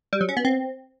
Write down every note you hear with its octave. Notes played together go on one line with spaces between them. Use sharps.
G3
F#3
C#4
B3
C4